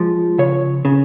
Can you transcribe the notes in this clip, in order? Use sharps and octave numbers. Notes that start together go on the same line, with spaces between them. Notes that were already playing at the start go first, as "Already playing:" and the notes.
Already playing: F3 G#3
C#3 C#5
C#3